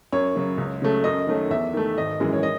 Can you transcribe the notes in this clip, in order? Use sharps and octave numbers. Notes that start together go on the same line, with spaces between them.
F#2 C#5
C#3 F#3
C#2
C#3 F#3 A3
F#2 D#5
D#3 F#3 A3
E2 E5
D#3 A3
G#1 D#5
F#2 E3 G#3
C#5
D#5